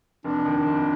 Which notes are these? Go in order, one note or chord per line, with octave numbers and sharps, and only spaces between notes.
F1 D4
D#2
F1